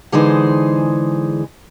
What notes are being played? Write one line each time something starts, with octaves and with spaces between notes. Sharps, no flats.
D3 E3 G#3 D#4 G#4 C5